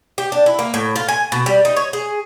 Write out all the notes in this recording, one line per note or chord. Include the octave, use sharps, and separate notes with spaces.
G4
D4
E4
A#3
A2
F4
G#5
B2
G3
D#4
C#5
G#4